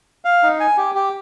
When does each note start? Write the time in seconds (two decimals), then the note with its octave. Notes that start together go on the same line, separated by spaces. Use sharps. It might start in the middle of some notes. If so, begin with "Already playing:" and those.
0.25 F5
0.43 D#4
0.60 G#5
0.77 G4
0.95 G4